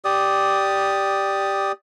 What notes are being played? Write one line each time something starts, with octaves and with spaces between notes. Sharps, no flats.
G4 D5 D#6